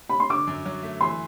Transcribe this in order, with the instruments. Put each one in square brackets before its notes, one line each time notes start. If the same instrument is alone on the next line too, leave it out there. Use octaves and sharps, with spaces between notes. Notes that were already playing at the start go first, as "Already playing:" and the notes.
[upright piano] B5
C6
[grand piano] D3 [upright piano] D6
[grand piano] F#2
F#3
A3
[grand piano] E3 [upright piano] C6